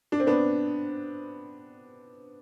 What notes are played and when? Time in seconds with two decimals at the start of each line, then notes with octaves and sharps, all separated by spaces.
0.12 D4
0.20 C4
0.27 B3 D4